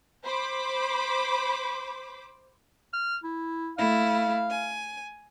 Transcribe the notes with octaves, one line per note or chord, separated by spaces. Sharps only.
C5 B5 D6
F6
E4
A3 E4 F5
G#5